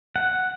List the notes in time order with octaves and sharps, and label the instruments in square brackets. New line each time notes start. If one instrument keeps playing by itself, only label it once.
[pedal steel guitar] F#5